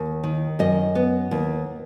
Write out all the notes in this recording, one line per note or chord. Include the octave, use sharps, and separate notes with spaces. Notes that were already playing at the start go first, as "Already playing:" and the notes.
Already playing: D#2
D#3
F#2 D#5
B3
D#2